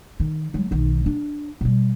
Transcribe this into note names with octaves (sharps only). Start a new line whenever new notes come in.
D#3
F#3 G#3
B1 D#3
D4
B2 G3